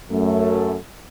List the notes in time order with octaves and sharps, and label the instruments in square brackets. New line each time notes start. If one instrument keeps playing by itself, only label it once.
[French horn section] F#2 A3